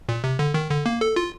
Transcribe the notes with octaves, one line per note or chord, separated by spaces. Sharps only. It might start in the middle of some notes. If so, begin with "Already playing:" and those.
A#2
C3
D3
D#3
D3
A#3
A4
F4